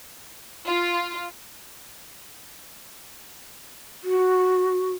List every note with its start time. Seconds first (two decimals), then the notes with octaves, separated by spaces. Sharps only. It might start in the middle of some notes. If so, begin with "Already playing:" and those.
0.65 F4
4.04 F#4